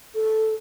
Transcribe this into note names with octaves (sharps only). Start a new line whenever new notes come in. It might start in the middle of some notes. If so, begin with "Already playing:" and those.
A4